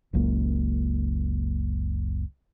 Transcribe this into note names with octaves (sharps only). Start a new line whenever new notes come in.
F#1 C#2 F#2 A#3